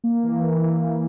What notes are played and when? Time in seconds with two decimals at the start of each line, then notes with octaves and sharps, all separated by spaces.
0.04 A#3
0.23 E3
0.43 E3
0.62 A#3
0.82 A#3